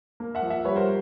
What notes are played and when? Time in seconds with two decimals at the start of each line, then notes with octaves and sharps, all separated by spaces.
0.20 A#3
0.35 E5 F#5
0.42 F3
0.50 E5 F#5
0.65 G3 B4 C#5
0.76 A#4 C5